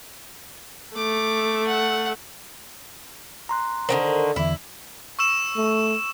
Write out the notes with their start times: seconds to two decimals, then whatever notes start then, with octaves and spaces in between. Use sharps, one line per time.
0.96 A3 D6
1.67 F#5
3.49 A#5 C6 F#6
3.89 D3 D#3 F#3 A#4 C5
4.36 E2 D3 E3 E4
5.19 C#6 E6 E7
5.57 A3